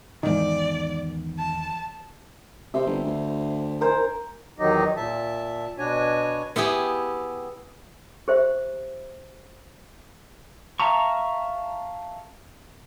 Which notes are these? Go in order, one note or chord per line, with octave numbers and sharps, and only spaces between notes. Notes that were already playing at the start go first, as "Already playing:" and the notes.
E2 G#2 D#3 E3 D#4 D5
A5
C3 C5 E5
G1
D2
A#4 C5 G#5
E2 D#3 F#3 D#4 G4 D#5
A#2 E5 A5
B2 D4 F#4 C#5 G#5
B3 E4 G4 G#4
G4 C5 E5
E5 F5 A5 A#5 C#6